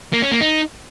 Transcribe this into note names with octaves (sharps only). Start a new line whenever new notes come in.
A#3
C#4
A#3
D#4